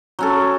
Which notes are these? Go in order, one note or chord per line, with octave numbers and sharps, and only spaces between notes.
F#3 C#4 A4